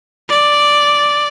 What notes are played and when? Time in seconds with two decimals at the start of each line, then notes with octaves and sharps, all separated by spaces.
0.29 D5